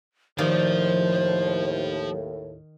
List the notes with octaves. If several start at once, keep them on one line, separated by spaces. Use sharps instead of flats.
D#2 A2 D#3 F3 C5 D5 F5